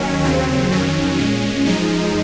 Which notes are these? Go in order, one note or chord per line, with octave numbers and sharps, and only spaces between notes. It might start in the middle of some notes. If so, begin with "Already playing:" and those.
Already playing: D#2 D#3 F#3 C#4
D#2 C#3 F#3 C4
F2 D#3 F#3 C#4
A#2 G#3
F#2 F3 G#3 D#4